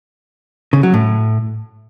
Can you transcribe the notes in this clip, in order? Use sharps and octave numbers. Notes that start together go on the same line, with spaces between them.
C#3
F#3
A2